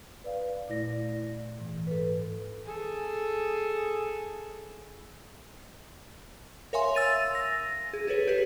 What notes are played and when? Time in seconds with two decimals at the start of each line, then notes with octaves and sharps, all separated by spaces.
0.24 B4 D5 F5
0.69 A#2 A3 E4 D5 A#6
1.58 G#2 E3
1.87 A4 B4
2.65 G#4 A4
6.73 A#4 C#5 E5 F5 G#5 C6
6.94 E6 A6 D#7 F7
7.35 A#6
7.93 G#4
8.07 G#4 A4 B4 C#5
8.27 G4 G#4 B4